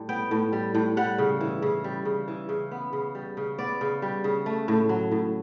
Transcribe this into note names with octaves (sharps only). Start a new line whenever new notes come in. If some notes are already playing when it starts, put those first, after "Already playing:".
Already playing: A2 G3
B3 G5
A2
G3
A2
G3 F#5
C#3
E3
C#3
G3
C#3
E3
C#3
B3
C#3
G3
C#3
B3 D5
C#3
G3
C#3
A3
A2
F#3
A2